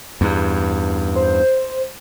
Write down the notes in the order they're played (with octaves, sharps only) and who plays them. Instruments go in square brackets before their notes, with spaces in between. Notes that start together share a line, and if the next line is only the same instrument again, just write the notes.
[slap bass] E2 G2
[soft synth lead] C5